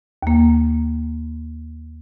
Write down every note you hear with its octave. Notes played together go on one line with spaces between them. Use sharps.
D#2 A#3